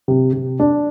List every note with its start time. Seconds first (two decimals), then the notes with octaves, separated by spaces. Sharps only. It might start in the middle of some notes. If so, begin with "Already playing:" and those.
0.08 C3
0.33 C3
0.60 D4